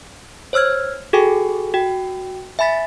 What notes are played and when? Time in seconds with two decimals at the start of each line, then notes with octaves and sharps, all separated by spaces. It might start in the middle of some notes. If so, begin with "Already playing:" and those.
0.53 C5 C#5 E6 F6 G#6
1.13 F#4 G#4 A4 G5 G#5
1.74 F#4 G5
2.59 E5 G#5 B5 A6 B6